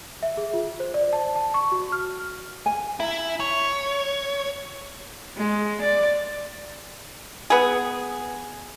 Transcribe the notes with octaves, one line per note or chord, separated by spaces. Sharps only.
E5
G#4
F4
C5
D5
A5
A5
C#6
F#4
F6
G#5
E4 A#5
C#5
G#3
D5
B3 G#4